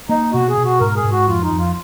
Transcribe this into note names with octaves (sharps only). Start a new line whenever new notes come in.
A#3 D#4
B2 F#4
G#4
B2
F#4
G#2 A#4
G#4
G#2
F#4
F2 F4
D#4
F2
F4